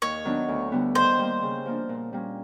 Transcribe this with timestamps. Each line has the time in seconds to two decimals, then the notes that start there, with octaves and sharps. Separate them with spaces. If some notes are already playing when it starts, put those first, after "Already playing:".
0.02 D#2 C#5
0.25 D#3 F#3 B3 D4
0.48 D2
0.72 D3 G3 B3
0.95 D#3 C5
1.18 G3 A#3
1.42 C#3
1.66 F3 A#3 D4
1.89 A#2
2.13 G3 A#3 C#4